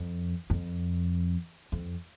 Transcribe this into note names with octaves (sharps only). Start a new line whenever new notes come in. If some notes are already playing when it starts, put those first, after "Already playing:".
Already playing: F2
F2
F2